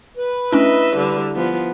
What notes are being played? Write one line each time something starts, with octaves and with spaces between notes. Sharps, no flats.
B4
A3 C#4 D4 E4 D#5 E5
D3 G3
F3 B3